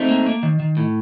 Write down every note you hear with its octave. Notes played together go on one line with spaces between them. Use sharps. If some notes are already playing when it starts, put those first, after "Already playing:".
Already playing: A3 C4 D#4
A#3
A#3
D#3
D#3
A2